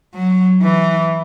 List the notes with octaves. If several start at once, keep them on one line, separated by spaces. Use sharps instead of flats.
F#3
E3